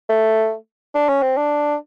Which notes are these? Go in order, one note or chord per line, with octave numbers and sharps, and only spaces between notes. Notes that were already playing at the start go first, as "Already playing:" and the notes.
A3
D4
C#4
C4
D4